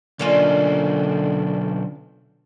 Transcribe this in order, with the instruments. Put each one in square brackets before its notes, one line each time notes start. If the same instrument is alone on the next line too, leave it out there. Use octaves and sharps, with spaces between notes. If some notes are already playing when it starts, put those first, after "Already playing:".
[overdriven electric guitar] B1 A#3 [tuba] D3 [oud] C#4 D4 F4